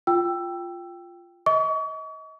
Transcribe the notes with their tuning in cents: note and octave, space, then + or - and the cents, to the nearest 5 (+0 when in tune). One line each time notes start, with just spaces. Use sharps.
F4 +0 G5 +0 E6 +15
D#5 +30 C#6 +40